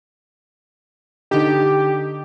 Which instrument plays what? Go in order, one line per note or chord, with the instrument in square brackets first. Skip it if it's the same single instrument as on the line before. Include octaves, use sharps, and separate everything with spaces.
[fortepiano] D3 D#4 [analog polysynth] G4